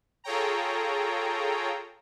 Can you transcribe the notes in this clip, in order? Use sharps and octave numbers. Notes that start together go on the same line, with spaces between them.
F4 G#4 A4 C#5 G5 A#5